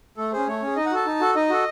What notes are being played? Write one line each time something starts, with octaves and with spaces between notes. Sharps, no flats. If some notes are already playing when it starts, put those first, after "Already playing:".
A3 A4
C#4 G#4 C5
A3 C#5
C#4 G#4
D#4 D#5
F#5
F#4 A4 A5
D#4
F#4 A4
D#4 D#5
F#4 A4